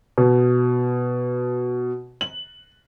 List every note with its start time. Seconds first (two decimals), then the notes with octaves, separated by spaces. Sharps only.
0.18 B2
2.21 F#7